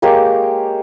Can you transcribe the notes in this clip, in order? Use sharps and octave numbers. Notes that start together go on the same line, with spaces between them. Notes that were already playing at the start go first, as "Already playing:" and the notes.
G#3 A#3 G4 C#5